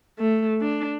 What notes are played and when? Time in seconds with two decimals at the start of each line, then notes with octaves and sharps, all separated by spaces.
0.19 A3
0.61 D4